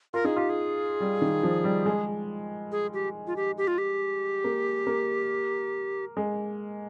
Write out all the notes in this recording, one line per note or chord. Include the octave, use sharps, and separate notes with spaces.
F4 A#4
D#4 G#4
F4 G4
G#4
G3
D#3
F3
G3
G#3
G#4
G4
F4
G4
G4
F4
G4
A#3
A#3
G#3